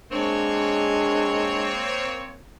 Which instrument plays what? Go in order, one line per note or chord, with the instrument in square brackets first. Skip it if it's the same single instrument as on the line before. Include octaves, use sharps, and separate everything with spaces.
[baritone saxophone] G#3 [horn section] A#3 C4 C#5 [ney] D4